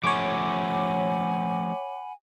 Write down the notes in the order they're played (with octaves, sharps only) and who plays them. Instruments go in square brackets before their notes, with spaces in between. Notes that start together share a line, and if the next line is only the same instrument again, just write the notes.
[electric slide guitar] F3 A3 C#4 [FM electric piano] C#5 D6 [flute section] F#5 G#5 B5